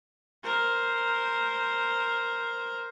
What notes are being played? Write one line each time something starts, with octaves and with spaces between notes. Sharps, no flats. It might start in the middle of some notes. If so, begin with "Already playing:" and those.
A#4 C5